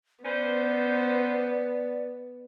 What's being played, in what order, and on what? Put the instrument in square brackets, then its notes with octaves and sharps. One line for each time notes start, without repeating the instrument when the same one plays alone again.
[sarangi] B3 [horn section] C#4 B4 C5 [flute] D5